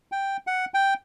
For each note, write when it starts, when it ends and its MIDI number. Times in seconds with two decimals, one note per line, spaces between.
0.12 0.37 79
0.47 0.65 78
0.74 0.94 79